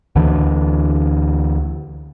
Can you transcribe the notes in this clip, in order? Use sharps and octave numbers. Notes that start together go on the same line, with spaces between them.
D2 D3 E3